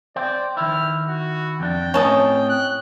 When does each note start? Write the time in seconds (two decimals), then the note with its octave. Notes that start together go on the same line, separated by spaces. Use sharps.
0.16 C5 D5 G5
0.57 D#3 E4 F6
1.07 F#4
1.60 F2 D4 G5
1.94 A2 C4 C#4 D#5 A5
2.49 F#6